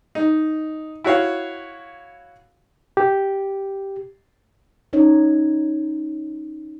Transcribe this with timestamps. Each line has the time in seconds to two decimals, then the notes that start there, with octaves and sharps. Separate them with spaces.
0.15 D#4
1.04 E4 F#4 C#5 F5
2.97 G4
4.93 C#4 D#4 C#5